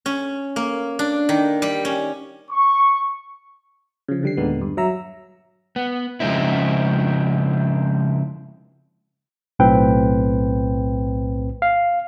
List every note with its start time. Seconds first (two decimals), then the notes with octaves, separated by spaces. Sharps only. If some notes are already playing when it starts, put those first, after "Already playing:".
0.06 C#4
0.56 A#3
0.99 D4
1.29 D#3
1.62 G3
1.85 C#4
2.51 C#6
4.09 C#3 F3
4.23 D3 G3 C7
4.37 D#2 A#2 D3 G#3 B3
4.61 G2
4.77 F#3 E5 A#5 E6
5.76 B3
6.20 C#3 F3 G#3 C4 D#4 E4
9.59 B1 A2 C4 B4 G5
11.62 F5